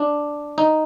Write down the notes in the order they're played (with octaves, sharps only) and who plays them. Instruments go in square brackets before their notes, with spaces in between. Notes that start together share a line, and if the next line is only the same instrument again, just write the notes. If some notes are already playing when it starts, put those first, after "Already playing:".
Already playing: [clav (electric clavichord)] D4
D#4